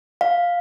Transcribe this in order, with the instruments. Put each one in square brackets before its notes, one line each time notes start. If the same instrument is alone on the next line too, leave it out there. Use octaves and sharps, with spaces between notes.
[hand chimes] F5